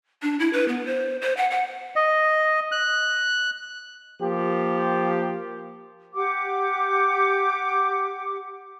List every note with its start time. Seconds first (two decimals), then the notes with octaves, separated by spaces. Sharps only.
0.22 D4
0.40 E4
0.53 B4
0.68 B3
0.86 C5
1.22 C5
1.37 F#5
1.51 F#5
1.96 D#5
2.72 F#6
4.20 F3 A#3 G4
6.14 G4 F#5 D6